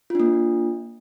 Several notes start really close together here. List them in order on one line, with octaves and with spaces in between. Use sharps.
F4 D4 A#3